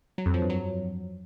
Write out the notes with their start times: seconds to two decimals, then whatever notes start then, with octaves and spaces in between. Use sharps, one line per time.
0.18 F#3
0.26 F2
0.34 F3
0.42 G2
0.50 F#3